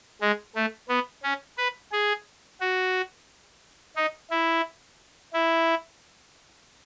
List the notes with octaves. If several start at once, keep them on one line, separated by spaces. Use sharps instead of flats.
G#3
A3
B3
C#4
B4
G#4
F#4
D#4
E4
E4